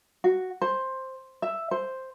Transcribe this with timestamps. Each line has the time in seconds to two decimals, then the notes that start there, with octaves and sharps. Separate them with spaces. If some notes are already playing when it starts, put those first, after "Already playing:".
0.24 F#4
0.62 C5
1.42 E5
1.71 C5